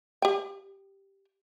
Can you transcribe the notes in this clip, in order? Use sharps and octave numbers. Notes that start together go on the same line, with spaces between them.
G4 G5